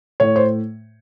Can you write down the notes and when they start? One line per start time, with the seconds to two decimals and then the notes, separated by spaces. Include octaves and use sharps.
0.20 A2 C#5
0.36 C5